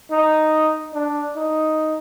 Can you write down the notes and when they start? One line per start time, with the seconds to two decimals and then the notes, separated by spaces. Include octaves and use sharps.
0.11 D#4
0.94 D4
1.36 D#4